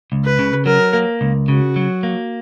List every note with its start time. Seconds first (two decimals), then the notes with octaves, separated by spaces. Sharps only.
0.12 C#2
0.25 B4
0.39 C#3
0.65 F#3 A#4
0.93 A#3
1.21 C#2
1.48 C#3 F#4
1.76 F#3
2.03 A#3